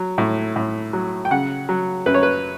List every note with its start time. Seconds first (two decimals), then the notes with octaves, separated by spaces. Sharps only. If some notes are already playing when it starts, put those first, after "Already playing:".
Already playing: F#3
0.18 A2
0.56 A2
0.93 F#3
1.25 G5
1.31 C#3 F#5
1.69 F#3
2.06 F#2 B4
2.14 C#5
2.23 B4